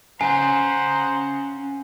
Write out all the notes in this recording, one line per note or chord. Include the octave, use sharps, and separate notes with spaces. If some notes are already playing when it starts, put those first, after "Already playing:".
C#4 C5 F5 F#5 G#5 A#5